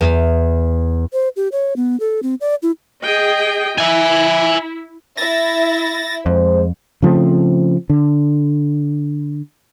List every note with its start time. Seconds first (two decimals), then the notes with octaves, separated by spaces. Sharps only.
0.01 E2
1.13 C5
1.36 G4
1.52 C#5
1.76 B3
2.00 A4
2.23 C4
2.41 D5
2.63 E4
3.04 G#4 D#5 G5
3.78 E4 E5 G#5
5.17 E4 E5 A6 A#6
6.26 F2 G#3 C5
7.02 C#3 F3 A3 C4
7.90 D3